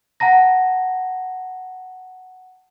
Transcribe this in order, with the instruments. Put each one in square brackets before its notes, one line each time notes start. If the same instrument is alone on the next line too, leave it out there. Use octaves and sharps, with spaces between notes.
[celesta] F#5 A5 A#5 A#6